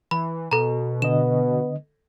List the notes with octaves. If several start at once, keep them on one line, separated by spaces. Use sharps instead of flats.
E3 B5
B2 A4 A#5
D3 B3 D#5 E7